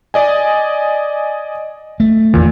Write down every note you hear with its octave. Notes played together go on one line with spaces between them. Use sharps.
D5 D#5 G#5
A3
E2 A#2 D#3